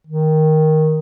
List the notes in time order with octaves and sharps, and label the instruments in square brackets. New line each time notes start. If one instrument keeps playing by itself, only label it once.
[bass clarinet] D#3